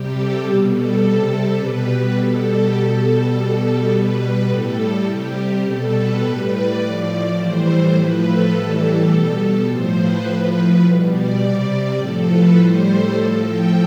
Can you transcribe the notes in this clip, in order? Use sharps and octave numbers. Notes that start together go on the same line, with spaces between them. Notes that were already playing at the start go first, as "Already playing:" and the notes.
Already playing: C3 G3 G4
A4
B2 G3
A4
C3 G3
B2 G3 B4
B2 G3 A4
G4
B2 G3 A4
A4
B2 G3
A4
B2 G3 B4
B4
A2 G3 A4
C3 G3 G4
B2 G3 A4
B4
A2 G3
D5
A2 F3
D5
A2 E3 G3 C5
A2 F3 B4
A4
A2 E3 G3
B2 G3 A4
A4
A2 F3 C5
B4
A2 F3 B4
B2 G3
D5
C3 G3
A2 F3 A4
B4
A2 G3 C5
A4
A2 F3 A4
G5